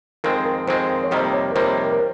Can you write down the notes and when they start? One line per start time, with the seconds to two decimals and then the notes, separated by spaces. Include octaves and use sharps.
0.24 F2 D#3 G#3 C4 A#4
0.45 A#4
0.68 F2 D#3 G#3 C4 C5
1.04 C#5
1.11 F2 C3 D#3 G3 A#3 D#5
1.33 C#5
1.52 A#4
1.55 F2 C3 D#3 G3 A#3 C5
1.78 A#4
1.93 A#4